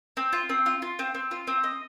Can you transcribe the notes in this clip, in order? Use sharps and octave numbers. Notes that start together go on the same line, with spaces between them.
C4
F4
C4
F4
F4
C4
C4
F4
C4
D#5